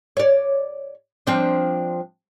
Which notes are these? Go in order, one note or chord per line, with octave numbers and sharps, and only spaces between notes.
C#5 D5
F3 C4 D4